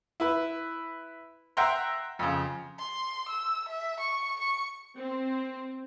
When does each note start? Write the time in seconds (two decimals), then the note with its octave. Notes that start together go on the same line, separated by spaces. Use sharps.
0.20 E4 B4
1.57 E5 F#5 G5 A#5 C6
2.19 F2 C#3
2.79 C6
3.29 E6
3.68 E5
4.00 C#6
4.40 C#6
4.97 C4